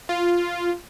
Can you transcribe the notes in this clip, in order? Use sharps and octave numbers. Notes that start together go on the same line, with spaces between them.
F4